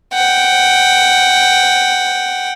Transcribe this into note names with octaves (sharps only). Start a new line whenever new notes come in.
F#5 G5